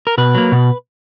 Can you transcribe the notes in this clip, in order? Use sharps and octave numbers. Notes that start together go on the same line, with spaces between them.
A#4
B2 B4
F#3 A#3
B2